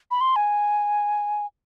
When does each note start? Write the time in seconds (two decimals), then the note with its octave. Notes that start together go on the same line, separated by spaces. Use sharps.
0.11 B5
0.21 C6
0.36 G#5